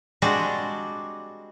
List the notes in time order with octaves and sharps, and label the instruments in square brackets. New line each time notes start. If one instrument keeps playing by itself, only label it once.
[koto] G3 G#3 C4 D4 F#4